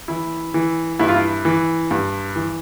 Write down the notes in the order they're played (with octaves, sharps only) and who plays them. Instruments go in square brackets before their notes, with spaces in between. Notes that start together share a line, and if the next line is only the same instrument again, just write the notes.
[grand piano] E3 E4
E3
G2 E4
F4
E4
E3
G2
E3